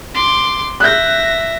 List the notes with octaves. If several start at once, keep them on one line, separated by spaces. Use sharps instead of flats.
C6 D6
E5 F#6 G6 A#6